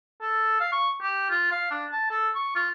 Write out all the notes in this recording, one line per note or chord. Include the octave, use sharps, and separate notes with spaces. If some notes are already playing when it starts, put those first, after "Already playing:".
A4
F5
C#6
G4
F4
F5
D4
A5
A4
C#6
F4